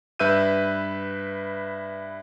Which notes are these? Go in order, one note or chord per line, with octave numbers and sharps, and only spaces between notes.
G2 B4 E5 E6 G6 D#7